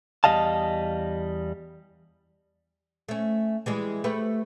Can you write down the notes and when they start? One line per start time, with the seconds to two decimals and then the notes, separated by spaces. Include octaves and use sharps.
0.24 E2 E3 G3 D#5 F5 A5
3.08 A3 C#4
3.66 E3 G3 G#3
4.04 A3 G4 B4